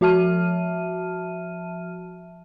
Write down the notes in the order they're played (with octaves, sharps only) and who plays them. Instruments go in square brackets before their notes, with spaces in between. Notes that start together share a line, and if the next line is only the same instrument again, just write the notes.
[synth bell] F3 F#4 E5 A5 F6 D#7